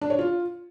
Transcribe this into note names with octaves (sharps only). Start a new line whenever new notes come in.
D4
C#5
F4